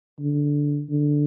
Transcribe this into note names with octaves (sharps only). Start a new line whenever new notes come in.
D3
D3